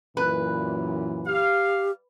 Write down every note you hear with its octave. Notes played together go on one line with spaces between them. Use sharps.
F#2 A#2 E3 B4
G4 F5